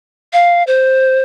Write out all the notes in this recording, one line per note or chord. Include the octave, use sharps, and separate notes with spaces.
F5
C5